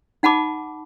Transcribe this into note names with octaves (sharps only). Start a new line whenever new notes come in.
D#4 F#5 A5 B5 D6